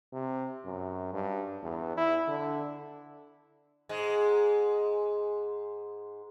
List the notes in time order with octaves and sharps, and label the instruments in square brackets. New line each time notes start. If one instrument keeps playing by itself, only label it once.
[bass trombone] C3
F#2
G2
E2
E4
D3
[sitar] G#2 G#3